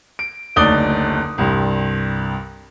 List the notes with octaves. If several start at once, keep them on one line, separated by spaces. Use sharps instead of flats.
D7
F#1 D2 D#4 D5 D#6 G7
C2 G2